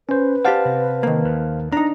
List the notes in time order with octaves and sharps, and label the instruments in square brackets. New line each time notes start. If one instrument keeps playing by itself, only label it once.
[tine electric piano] C#4 C5 [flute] B4
[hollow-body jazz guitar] G4 D5 F#5 [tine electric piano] C5 F5 A5
[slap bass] C3
[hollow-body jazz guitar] D#3 A#3
[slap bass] D#2
[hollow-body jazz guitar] D4 D#4 [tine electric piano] A#5